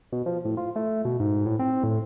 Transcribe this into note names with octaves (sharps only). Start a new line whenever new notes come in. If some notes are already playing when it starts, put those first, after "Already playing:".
B2
F3
A2
F4
A3
B2
G#2
A2
C4
A2